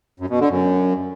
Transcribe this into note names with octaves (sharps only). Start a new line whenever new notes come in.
F#2
B2
D3
F#2